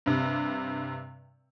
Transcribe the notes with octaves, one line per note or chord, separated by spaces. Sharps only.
G2 C3